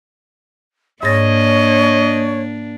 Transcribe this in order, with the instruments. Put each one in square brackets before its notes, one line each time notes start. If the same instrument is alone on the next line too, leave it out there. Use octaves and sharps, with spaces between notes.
[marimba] G#2 A6 A#6 [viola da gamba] A#3 D4 [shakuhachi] C#5 [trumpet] D#5